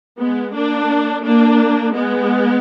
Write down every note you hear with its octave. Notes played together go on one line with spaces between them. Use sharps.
G#3 B3
A#3 D4
A#3 D4
G#3 B3